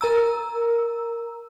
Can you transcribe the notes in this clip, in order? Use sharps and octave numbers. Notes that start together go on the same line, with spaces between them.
A#4 A#5 E6